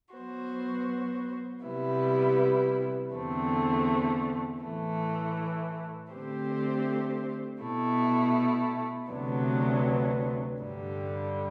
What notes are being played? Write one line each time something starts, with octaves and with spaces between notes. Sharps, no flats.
F#3 B3 F#4 C5
C3 G3 B3 E4
E2 D3 A3 C4
A2 E3 A3
D3 A3 C4 G4 C5
B2 A3 E4
D2 C3 F#3 B3 D4
G2 D3 G3